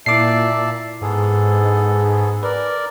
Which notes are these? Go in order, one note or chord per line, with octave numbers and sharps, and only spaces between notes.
A#2 E4 D5 E5 A5 D6 C7
G#2 B3 G#4 A4
A#4 B4 D5